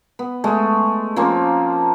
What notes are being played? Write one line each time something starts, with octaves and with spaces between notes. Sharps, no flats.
B3
G#3 A3
F3 A#3 C4 C#4